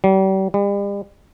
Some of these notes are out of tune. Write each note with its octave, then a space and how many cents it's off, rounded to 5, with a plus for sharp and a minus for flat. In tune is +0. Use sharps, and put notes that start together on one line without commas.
G3 -40
G3 +40